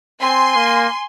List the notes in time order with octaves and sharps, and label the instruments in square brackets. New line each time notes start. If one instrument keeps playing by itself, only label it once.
[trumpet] C4 [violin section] G#5 C6
[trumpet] A#3